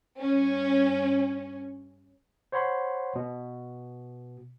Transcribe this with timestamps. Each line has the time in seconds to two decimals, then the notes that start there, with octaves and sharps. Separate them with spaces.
0.19 G2 C#4
2.52 C5 C#5 F#5 B5 C6
3.15 B2